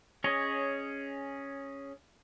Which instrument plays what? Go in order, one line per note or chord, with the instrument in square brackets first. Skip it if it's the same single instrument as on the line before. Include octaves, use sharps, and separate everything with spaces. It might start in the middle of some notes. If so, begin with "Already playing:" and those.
[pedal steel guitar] C#4 G#4 C#5 D#5